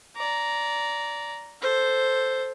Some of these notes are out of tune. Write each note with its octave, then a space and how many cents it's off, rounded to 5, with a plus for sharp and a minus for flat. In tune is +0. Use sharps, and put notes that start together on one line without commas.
D5 -20 A#5 +0
A4 +0 C5 +0